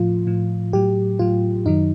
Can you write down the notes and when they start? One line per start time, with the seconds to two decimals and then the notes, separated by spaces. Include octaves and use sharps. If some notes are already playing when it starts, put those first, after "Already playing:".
Already playing: A2 F3 F4
0.27 A2 F3
0.73 A2 F#3 G4
1.19 A2 F#3 F4
1.66 F#2 D#3 F#3 D#4